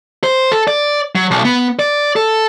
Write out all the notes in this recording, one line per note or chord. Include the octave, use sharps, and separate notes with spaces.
C5
A4
D5
F#3
B1
B3
D5
A4